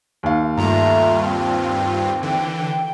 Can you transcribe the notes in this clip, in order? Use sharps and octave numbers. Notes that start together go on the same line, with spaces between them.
D#2 F5
G2 A3 F4 A#5
C4
D3 E3 G5